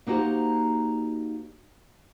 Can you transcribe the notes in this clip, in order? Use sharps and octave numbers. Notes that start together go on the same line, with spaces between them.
A#3 B3 D#4 F#4 G4 C5